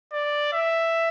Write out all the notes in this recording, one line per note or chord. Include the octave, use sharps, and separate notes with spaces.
D5
E5